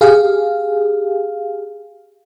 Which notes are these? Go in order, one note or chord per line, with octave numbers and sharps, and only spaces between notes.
G4 G#4 F5